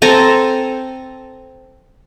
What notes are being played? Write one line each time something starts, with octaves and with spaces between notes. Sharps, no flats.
C4 A4 G#5 A#5